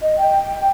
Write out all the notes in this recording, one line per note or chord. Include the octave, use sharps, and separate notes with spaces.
D#5
G5